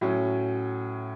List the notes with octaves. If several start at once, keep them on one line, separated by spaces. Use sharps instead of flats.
A2 F#3 C#4